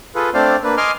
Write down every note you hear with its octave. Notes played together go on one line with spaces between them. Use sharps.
F4 G#4 A4 B4
A3 C4 D4 C5 D5 F5
A#3 D4 B4
D#5 G#5 C6 D6 F6